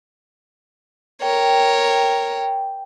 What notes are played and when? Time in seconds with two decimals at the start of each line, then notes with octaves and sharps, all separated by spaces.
1.22 A#4 C#5 G5